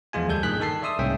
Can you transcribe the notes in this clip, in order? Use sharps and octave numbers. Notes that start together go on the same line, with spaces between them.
E2 F3 G#3 F4 G#5
D2 G3 A4 G6 G#6
G2 A#2 D#3 G#4 F#6 B6
D#3 A4 A5 C7
D5 E5 C6 D#6 E6
C2 G#2 A#3 C#4 E5 G5